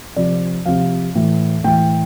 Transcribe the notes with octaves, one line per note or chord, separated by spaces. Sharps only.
C3 F3 D5
C3 F3 F5
A2 E3
A2 E3 G5